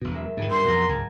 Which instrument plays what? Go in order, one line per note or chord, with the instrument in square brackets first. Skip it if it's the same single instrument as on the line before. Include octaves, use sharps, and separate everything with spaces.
[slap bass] E1 B2
[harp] F#2 G#3 E5
[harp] D#1 [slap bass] G#2 D#3
[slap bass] G2 [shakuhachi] C6 [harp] E6
[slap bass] F2 B2 [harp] F#5 A#5 A#6
[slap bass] C#2 G#2 [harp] G#5 A5